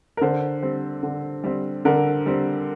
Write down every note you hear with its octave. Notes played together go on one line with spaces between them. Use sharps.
A#4
D3 C5
G3 C4
D3
G3 C4
D3 A#4
G3 C4